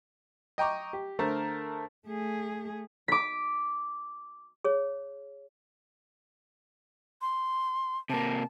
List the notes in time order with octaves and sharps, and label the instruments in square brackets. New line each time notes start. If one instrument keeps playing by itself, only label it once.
[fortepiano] D#5 G5 A#5 C#6 D6
G4
D3 A3 A#4 C5 A5
[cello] A3 G#4
[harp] D6 B6
[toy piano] G#4 C#5
[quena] C6
[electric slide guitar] C3 A#3 [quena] A5